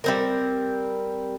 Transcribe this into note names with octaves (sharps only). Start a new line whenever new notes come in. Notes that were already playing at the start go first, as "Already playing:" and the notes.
G3 C4 A#4